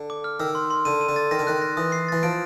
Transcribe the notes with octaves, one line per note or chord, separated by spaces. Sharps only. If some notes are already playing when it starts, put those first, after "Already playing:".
Already playing: D3
D6
F6
D#3 E6
C6
C6
D3 D#7
D#7
D3
A6
D#3 A#6
D3
D#3 F#6
A#6
E3 D#6
C7
E3 A6
F3 D7